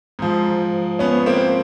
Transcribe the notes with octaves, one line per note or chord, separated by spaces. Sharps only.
G#2 F3
B3 C#4
A#3 C4